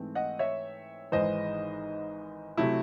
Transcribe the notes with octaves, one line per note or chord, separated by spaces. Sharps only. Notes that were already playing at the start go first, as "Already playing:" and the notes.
Already playing: G#2 E3 A3 C4
D#5 F#5
C#5 E5
G#1 G#2 E3 C5 D#5
C3 F#3 A3 E4